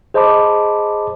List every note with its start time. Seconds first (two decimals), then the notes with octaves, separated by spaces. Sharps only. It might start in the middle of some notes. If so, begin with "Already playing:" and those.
0.14 G#4 C5 D#5 A5 B5 D6